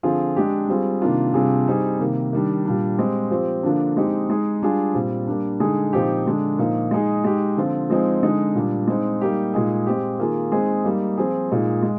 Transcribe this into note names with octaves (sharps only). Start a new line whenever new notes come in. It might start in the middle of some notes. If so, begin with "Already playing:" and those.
D3 F3 C4 F4 G#4
G#3 D4 G4
G3 C4 F4 G#4
C3 D#3 A#3 D4 F4
C3 G3 D4 F4 G#4
G3 C4 D#4 G#4
C3 D#3 A#3
D#3 G3 D4
A#2 G3 D4
G#3 C4 G4
F3 C4 G4
D3 F3 A#3 D4
G#3 C4 D#4 G4
G#3 D#4 G#4
G3 D4 F4 G#4
A#2 G3 C4
G3 A#3 D4
D3 G#3 D#4 G#4
A#2 F3 C4 D#4 G4
D3 G#3 D4
A#2 F3 A#3 D#4
G#3 D#4 G#4
G#3 D#4 G4
D3 F3 C4 F4
F3 G#3 C4 D#4 G#4
D3 G#3 D#4
A#2 G3 D4
G#3 C4 D#4
G3 A#3 D#4 G4
A#2 G#3 D#4 G#4
G#3 C4 G4
D#3 A#3 F4 G#4
G#3 C4 D#4 G#4
G3 A#3 D#4
F3 C4 F4 G#4
A#2 G#3 D#4 G#4
G#3